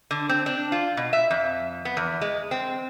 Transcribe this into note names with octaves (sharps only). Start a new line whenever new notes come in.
D3
C4
D4
F4
B2
E5
F2
B3
E2
G#3
C4